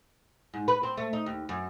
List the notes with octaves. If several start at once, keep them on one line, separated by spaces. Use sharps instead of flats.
G#2
B4
C4
A3
D#4
D#2
F#2